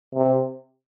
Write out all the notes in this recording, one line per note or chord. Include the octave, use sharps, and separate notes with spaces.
C3